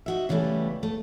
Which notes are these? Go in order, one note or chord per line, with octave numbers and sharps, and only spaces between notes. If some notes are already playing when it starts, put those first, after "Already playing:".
D#4 F#4 E5
C#3 E3 G3 A3 B3
A3